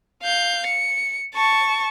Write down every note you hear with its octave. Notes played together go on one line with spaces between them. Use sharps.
F5 G6
C#7
A5 C#6